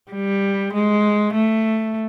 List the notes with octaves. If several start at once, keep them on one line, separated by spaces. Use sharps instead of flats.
G3
G#3
A3